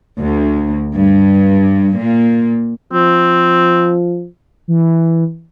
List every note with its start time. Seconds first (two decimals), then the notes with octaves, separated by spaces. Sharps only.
0.21 D2
0.96 G2
1.99 A#2
2.93 F3 C4
4.68 E3